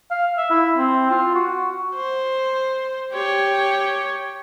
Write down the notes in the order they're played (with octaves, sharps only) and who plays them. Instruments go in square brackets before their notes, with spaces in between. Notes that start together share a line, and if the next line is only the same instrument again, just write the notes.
[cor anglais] F5
E5
E4
C4
F4
F#4
[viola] C5
G4 C#5